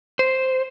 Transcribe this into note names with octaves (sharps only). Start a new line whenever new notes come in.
C5